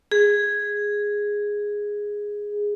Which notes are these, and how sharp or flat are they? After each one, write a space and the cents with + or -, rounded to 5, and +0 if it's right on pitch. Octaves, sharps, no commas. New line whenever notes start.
G#4 -5